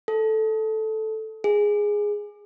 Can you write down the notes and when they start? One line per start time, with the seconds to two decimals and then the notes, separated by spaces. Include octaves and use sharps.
0.08 A4
1.44 G#4